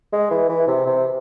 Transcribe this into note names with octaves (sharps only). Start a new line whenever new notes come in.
G#3
E3
E3
C3
C3